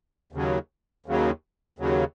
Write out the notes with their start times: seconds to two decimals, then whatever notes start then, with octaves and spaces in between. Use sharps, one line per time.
0.32 D#2 C#3 F#3
1.06 D#2 C#3 F#3
1.79 D#2 C#3 F#3